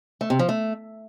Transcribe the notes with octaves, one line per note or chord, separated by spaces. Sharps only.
A3
C3
F3
A3